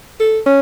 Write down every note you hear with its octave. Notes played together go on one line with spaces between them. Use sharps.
A4
C#4